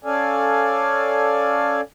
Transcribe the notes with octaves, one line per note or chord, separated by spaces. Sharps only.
C#4 A4 D5 F5 G#5